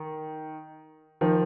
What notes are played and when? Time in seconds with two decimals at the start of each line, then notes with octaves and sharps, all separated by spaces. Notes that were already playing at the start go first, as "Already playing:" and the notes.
Already playing: D#3
1.21 D#3 F3